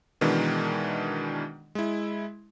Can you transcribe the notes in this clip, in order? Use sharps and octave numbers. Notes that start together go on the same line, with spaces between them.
B2 D#3 E3 G#3 D4
G#3 E4